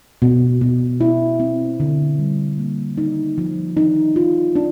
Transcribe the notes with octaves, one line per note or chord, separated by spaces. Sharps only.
B2
B2
E4
C4
D3
G3
A#3
D#4
F3
D#4
F4
D4